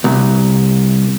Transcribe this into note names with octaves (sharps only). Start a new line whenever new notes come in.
C2